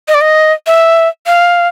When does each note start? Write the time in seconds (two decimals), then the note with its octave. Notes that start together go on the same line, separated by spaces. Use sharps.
0.08 D#5
0.14 D5
0.21 D#5
0.67 E5
1.26 F5